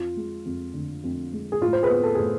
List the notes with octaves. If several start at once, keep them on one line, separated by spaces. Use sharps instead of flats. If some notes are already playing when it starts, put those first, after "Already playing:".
Already playing: F2 F4
G#3
F2
D3
F2
G#3
G#4
A2 F4
C5
G#4 B4
B3
A4
A2 G#4